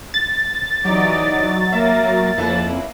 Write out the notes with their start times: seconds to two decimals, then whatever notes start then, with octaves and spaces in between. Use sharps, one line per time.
0.14 A6
0.85 E3 F#3 D#4 G4 D5
1.72 A#3 A#4 E5
2.37 F2 C#3 A#3 E4 B4